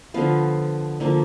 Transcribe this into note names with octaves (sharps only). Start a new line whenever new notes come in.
D3 F3 B3 F5
D3 F3 A#3